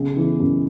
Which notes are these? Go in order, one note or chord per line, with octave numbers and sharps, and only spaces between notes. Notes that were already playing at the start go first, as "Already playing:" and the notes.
Already playing: B1 C#3
E3
F#2